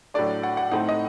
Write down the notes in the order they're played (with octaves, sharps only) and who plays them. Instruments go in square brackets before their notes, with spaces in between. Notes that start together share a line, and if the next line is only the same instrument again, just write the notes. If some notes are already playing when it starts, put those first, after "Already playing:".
[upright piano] A2 F#3 A3 D4 D5
F#5
F#5
A2 A3 C4 D#4 F#5
D#5